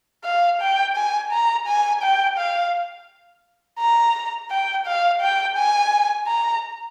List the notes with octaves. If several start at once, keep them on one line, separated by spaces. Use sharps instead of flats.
F5
G5
G#5
A#5
G#5
G5
F5
A#5
G5
F5
G5
G#5
A#5